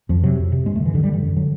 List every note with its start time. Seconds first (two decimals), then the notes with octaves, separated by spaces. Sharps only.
0.09 F2 F3
0.24 C3 F#3
0.39 F2
0.52 C3
0.66 G2 G#3
0.75 A3
0.80 D3
0.85 E3
0.94 G2 D3
1.04 G3
1.09 D3 E3
1.23 F#2
1.36 D3 F#3